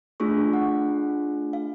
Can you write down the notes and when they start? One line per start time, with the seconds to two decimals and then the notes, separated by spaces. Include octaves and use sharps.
0.20 A3 D4 F4 G#4 C#6
0.53 F#5
1.53 F5